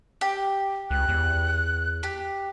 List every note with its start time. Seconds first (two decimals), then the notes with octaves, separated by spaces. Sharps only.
0.21 G4
0.91 C#2 F#6
1.09 E2
2.03 G4